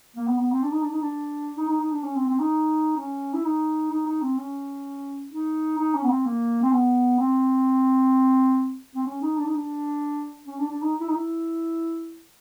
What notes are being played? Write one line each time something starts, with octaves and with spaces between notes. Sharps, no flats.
A#3
B3
B3
C4
D4
D#4
D4
D#4
D4
D#4
D#4
D#4
D4
C#4
C4
C4
D#4
C#4
E4
D#4
D#4
D#4
C4
C#4
D#4
D#4
C#4
B3
C4
A#3
C4
B3
C4
C4
C#4
D#4
D4
D#4
D4
C#4
D4
D4
D#4
E4
D#4
E4